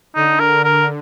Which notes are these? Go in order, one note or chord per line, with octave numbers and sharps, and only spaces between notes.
D3 D#4
A#4
A#4